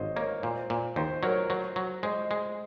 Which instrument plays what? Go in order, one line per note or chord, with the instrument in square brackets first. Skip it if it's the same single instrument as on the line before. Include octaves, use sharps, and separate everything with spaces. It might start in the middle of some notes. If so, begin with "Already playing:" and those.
Already playing: [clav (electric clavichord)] G#1 [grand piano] C5 C#5 D#5 F5
[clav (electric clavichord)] A#3 [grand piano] A#4 C#5
[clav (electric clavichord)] A#2 [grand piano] C5
[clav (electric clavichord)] A#2
[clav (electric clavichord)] D#2 [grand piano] C5
[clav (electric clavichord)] F#3 [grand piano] A#4 C#5
[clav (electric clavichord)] F#3 [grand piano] C5
[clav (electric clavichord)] F#3
[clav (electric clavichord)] G#3 [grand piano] C5 D#5
[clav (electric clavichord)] G#3